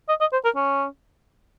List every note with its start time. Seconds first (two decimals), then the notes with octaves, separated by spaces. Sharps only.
0.09 D#5
0.21 D#5
0.33 C5
0.45 A#4
0.56 C#4